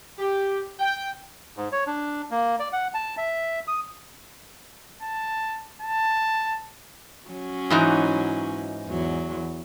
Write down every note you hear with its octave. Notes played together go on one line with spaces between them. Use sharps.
G4
G5
G#2
C#5
D4
A#3
D5
F#5
A5
E5
D#6
A5
A5
F#3 C#4
G#2 E3 D#4
E2 F#3